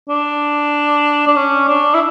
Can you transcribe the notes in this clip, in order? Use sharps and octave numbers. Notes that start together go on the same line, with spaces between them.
D4
D4
C#4
D4
E4